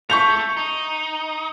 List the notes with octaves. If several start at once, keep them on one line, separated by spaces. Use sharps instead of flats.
A3 C#6 G6 F7
D#4